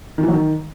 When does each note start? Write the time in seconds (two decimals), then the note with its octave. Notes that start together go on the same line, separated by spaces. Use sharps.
0.18 D#3
0.23 E3
0.28 F#3
0.33 D#3